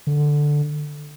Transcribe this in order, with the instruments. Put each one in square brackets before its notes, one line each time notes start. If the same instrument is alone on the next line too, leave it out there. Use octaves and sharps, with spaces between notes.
[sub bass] D3